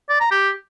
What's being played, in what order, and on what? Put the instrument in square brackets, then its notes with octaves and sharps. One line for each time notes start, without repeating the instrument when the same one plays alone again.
[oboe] D5
A#5
G4